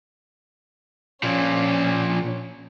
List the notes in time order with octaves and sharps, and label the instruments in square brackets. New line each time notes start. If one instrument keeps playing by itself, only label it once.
[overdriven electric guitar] A#2 F3 [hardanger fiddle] C#4